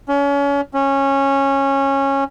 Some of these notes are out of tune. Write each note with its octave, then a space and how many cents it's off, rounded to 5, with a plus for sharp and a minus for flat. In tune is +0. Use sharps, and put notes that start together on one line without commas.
C#4 +30
C#4 -15